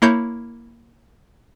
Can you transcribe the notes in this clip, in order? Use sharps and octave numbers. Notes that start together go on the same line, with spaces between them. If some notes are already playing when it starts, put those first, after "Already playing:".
A#3 E4 C#5 G6